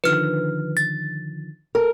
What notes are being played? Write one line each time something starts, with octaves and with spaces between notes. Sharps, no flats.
D3 D#3 F3 B4 F6
A6
A4 A#4